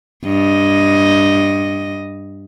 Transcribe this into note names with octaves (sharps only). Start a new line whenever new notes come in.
G2 D#5